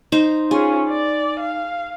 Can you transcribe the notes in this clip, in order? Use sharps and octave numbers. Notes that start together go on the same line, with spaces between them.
D#4 C5
C#4 F4 G#4
D5
F5